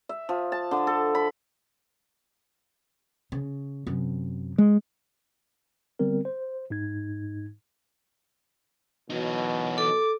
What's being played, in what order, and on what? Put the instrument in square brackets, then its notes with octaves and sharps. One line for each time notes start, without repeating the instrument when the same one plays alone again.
[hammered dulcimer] E5
F3
A5
D3
A4
B5
[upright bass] C#3
F#2 C3
[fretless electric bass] G#3
[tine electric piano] D3 G3 B3 C4 A#4
C5
G#2 D#4 G#6
[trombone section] B2 F#3 [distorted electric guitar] E3 D#4
[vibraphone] A4 [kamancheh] D6